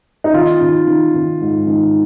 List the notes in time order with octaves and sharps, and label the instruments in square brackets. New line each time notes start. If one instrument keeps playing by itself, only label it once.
[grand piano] D#4
D#3 F4
D#3
D#3
D#3
G#2
D#3